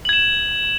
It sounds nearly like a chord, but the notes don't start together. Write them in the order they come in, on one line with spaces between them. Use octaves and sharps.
F#7 G#6 E7